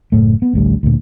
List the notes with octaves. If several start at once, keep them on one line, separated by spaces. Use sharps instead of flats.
F#1 A2 A3
B3
A1 D2 G3
D2 A#2